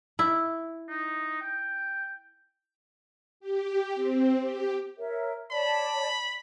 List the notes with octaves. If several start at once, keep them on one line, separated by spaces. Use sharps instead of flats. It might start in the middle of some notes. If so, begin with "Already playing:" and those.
E4
D#4
G5
G4
C4
G4
A#4 C#5 E5
C#5 D5 A5 B5